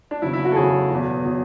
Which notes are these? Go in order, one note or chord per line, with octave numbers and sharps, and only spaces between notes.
D4
E2 C#3 F#3 E4
E4
F#4
A4
E2 C#3 F#3 G#4
E2 B2 F#3
B2 F#3